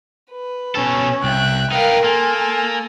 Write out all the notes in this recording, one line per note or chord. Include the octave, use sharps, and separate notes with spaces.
B4
B2 C#4 A4 C#5
C2 E5 G5 F#6
D#4 A#4 B4 F5 G5 F6
A#3 A4 G#5 C6